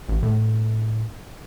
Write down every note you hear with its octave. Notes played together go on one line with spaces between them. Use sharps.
A1
A2